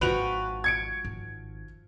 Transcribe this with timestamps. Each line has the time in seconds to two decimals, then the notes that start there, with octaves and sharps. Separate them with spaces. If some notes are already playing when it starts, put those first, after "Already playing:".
0.01 G#1 F3 G#3 F#4 B4 G5 F7
0.64 G#6 C#7 D7
1.05 G#1